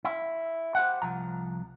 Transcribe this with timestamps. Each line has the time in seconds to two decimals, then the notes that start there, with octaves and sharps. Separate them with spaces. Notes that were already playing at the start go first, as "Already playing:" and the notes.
0.05 E4
0.75 G4 C5 F#5
1.02 C2 F3 A#5